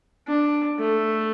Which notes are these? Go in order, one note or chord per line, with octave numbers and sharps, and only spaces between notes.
D4
A3